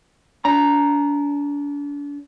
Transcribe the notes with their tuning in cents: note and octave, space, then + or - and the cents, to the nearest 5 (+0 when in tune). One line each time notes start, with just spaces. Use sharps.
D4 -35 A#5 +0